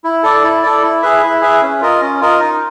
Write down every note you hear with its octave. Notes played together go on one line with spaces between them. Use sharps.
E4
A4 D5
E4
A4 D5
E4
G#4 B4 E5
E4
G#4 B4 E5
C#4
F4 A#4 D#5
C#4
F4 A#4 D#5
D#4